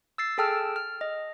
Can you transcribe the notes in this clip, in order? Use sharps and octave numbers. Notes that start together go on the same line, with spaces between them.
E6 A6 C7
G#4 A4 G5 A5 E6 F6
F6
D#5